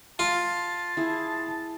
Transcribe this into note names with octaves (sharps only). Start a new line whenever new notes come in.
F4 A5
E4 G#4